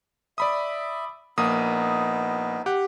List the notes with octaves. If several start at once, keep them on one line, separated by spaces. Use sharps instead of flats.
D5 E5 B5 D#6
A#1 A#3 B3 D#4 D#6
G4 F#5